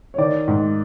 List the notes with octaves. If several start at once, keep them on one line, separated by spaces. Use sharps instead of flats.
C#5
D#3 D5
G#2